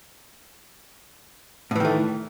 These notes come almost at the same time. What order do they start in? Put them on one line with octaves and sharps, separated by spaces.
A2 E3 D#3 A3